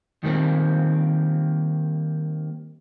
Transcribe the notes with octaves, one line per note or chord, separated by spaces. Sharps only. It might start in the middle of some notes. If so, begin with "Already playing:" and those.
D#3 G3 A#3 C4